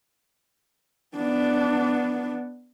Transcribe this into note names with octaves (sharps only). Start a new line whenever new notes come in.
B3 D4